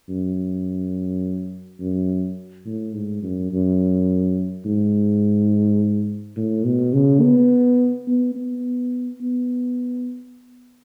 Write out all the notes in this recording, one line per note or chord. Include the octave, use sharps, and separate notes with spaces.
F#2
F#2
A2
G#2
F#2
F#2
G#2
A2
B2
C#3
B3
B3
B3
B3